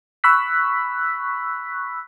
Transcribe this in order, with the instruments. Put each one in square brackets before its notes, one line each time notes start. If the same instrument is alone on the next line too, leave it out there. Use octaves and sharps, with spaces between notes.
[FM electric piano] B5 C#6 E6 F#6 B6